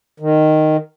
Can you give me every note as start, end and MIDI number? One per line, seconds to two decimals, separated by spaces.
0.20 0.77 51